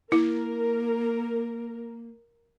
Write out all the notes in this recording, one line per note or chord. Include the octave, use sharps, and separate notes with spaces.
A#3 E4 A#4